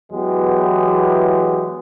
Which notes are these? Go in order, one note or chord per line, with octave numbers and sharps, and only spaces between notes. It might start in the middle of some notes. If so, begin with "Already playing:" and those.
E2 E3 F#3 G#3 B3 G4